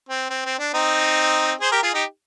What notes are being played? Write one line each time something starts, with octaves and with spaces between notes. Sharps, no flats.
C4
C4
C4
D4
C4 D#4
G#4 C5
G4 A#4
F4 G#4
D#4 G4